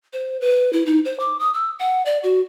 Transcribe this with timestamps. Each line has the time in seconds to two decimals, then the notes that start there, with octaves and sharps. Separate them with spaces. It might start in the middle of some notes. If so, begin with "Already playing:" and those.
0.13 C5
0.41 B4
0.73 E4
0.86 D#4
1.05 C5
1.20 D6
1.40 D#6
1.54 E6
1.79 F#5
2.06 D5
2.23 F#4